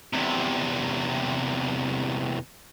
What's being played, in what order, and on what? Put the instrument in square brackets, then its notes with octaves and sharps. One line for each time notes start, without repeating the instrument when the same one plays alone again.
[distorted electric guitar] E2 C3